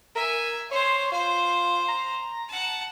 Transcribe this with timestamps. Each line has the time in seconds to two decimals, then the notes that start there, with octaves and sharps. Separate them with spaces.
0.15 A#4 E5 G#5
0.71 C5 C#5 C6
1.12 F4 C5
1.88 A#5
2.48 F#5 A5